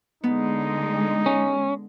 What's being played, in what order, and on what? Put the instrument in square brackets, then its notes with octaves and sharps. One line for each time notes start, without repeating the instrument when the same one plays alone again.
[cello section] D3 G#3 [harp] B3 [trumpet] D#4
[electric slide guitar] C#4